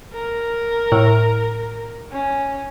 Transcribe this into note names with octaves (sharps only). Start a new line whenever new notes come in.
A#4
A2
C#4